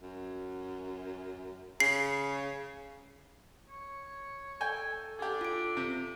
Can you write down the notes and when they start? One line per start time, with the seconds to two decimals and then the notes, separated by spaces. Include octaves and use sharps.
0.02 F#2
1.80 C#3 C7
3.69 C#5
4.61 A4 G5 G#5
5.19 D4 G4 G#4
5.41 F4 D7
5.77 C3